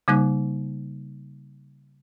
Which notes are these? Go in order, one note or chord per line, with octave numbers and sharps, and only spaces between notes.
C#3 G3 A#3 D#4 F#6